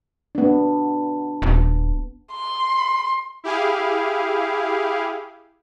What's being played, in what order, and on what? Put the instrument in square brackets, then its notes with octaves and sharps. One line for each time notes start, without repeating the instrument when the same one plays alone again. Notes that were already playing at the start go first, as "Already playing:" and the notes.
[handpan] B3 D4
[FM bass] D#1
[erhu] C6
[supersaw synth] E4 G4 G#4 F5